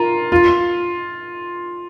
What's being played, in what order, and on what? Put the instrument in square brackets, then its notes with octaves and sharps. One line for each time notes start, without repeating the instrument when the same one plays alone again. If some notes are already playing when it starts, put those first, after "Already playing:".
Already playing: [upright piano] F4 A#4
F4